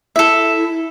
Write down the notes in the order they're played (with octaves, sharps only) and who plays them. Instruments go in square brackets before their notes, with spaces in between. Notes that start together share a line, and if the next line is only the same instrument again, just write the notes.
[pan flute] E4 [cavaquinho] A4 E5